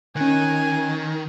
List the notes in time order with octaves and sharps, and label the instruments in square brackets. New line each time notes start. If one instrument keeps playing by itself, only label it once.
[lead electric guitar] D#3 [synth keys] C#4 F#6 [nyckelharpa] G#5